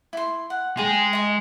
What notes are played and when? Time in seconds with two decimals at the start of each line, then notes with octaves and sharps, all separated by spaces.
0.13 E4 C6
0.50 F#5
0.77 G#3 G#4 G5 G#5
1.13 D#5 D#6